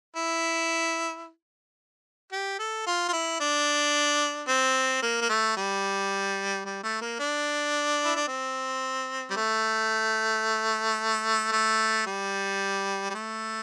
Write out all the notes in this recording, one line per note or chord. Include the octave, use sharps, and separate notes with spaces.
E4
G4
A4
F4
F4
E4
D4
C4
A#3
A#3
A3
G3
G3
A3
A#3
D4
E4
D4
C4
G3
A3
A3
G3
G3
A3